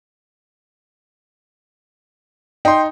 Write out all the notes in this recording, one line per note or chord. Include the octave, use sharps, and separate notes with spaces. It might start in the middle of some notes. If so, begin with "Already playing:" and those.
D#4 G5 C6